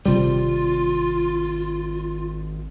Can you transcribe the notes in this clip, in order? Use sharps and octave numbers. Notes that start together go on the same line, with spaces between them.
G#1 C3 G3 F4